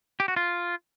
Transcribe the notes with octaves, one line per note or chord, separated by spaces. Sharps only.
G4
F#4
F4